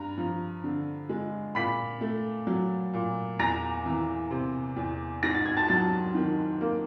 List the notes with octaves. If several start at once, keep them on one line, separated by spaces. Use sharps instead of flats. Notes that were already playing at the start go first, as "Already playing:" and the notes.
Already playing: G2 A#5
F3
D3
G#3
A#2 B5 B6
A3
F#3
A#2
E2 A#5 A#6
E3
C3
E2
G#2 A#6
A6
G#6
A5 A6
F#3 A5 A6
D#3
A#3